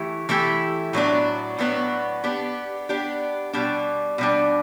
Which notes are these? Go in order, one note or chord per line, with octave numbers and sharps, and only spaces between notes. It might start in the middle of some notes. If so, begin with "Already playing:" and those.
Already playing: E3 A3 E4 G4
E3 A3 E4 G4
A2 F#3 B3 D4
A2 F#3 B3 D4
B3 D4 G4
B3 D4 G4
B2 G3 D4
B2 G3 D4